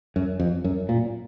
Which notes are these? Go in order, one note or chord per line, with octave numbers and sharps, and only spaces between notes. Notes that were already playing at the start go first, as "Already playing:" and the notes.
F#2
F2
F#2
A#2